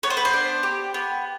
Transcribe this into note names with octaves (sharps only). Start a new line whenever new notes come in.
B3 C#5
C5
B4
C5
D4
G4
B3